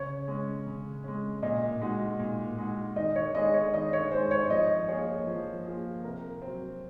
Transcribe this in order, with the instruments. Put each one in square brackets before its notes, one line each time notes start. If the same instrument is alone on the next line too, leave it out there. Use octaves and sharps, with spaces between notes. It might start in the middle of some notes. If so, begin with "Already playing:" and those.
Already playing: [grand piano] C#3 [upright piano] C#5
[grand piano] G#3 C#4
C#3
G#3 C#4
[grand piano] A#2 [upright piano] D#5
[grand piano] G#3 D#4 F#4
A#2
G#3 D#4 F#4
[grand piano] D#3 [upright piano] D#5
[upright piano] C#5
[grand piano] G#3 D#4 G#4 [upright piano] D#5
[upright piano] C#5
[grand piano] D#3 [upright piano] D#5
[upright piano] C#5
[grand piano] G#3 D#4 G#4 [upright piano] C5
[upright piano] C#5
[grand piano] F3 [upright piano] D#5
[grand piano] A#3 F4 G#4 [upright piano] C#5
[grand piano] F3
A#3 F4 G#4
[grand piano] C3 [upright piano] A#4
[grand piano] C4
F#3